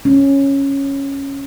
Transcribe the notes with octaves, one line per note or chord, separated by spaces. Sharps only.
C#4